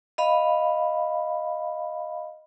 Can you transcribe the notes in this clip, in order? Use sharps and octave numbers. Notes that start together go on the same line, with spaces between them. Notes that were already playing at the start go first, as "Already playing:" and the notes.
D#5 F5 B5